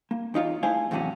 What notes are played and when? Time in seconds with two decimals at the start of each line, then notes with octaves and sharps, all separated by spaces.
0.11 A#3
0.34 E2 D#4 F4 C#5
0.63 A3 E4 G#4 C5 F5 G#5
0.91 E2 A2 C3 E3 F#3 C#4